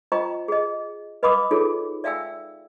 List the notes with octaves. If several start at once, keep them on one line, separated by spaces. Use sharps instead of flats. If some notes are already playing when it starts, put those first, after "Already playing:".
F4 C5 D#5 G5 A#5 C#6
G#4 D#5
B4 D#5 F5 B5 D6 D#6
D#4 F4 G#4 A4 C#5
D5 E5 F5 G5 G#5 E6